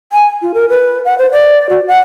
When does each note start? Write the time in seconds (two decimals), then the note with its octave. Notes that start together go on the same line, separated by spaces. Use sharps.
0.13 G#5
0.42 F4
0.54 A#4
0.69 B4
1.05 F#5
1.18 C5
1.32 D5
1.69 F#4
1.87 F#5